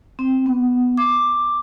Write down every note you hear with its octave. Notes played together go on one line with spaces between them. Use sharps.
C4
B3
D6